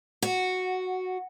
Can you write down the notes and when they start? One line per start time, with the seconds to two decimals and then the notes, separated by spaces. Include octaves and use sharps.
0.22 F#4